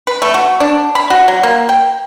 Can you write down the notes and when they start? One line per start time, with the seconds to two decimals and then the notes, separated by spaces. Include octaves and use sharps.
0.07 B4
0.22 A3
0.34 F#4
0.60 D4
0.95 B5
1.10 F#4
1.28 F#3
1.43 A#3
1.69 G5